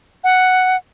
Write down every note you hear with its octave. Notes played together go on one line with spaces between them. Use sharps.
F#5